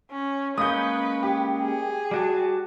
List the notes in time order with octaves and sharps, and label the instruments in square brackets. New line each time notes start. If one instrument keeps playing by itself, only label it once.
[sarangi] C#4
[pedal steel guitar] G#3 A#3 C#4 [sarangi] B4 [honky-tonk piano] D#6 G6
[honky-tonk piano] G4
[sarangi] G#4
[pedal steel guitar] G3 F#4 A5